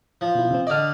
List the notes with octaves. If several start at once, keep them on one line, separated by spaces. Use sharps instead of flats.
F3
B2 E4
C3 C4
D3 D5 D#5 F6